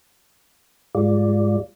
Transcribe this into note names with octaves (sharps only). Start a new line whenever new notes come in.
G#2 G3 G#3 F4 D5